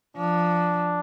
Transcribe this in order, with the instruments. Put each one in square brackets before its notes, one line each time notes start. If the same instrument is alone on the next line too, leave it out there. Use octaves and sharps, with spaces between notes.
[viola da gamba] F3 [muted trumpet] D4